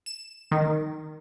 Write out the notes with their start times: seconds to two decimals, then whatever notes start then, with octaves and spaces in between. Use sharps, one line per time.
0.06 E7
0.51 D#3